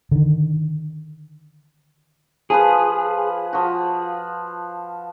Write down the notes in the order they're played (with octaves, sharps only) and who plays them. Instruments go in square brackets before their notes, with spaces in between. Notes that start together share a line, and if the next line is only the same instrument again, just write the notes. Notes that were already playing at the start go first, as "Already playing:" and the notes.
[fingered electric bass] D3 D#3
[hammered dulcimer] F3 F4 B4 [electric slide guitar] G#4
[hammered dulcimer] F3 F#4